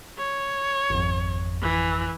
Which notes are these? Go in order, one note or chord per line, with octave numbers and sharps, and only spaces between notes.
C#5
G#1 F2
E3